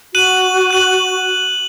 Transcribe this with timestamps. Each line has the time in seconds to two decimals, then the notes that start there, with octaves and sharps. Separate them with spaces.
0.14 F#4 F#6 D#7 F#7
0.71 F#6 D#7 F#7